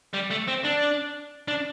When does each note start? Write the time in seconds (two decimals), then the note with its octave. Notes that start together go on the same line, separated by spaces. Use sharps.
0.13 G3
0.30 A3
0.47 C4
0.64 D4
1.48 D4